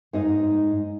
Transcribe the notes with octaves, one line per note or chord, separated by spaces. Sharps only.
G#2 D#4 D#5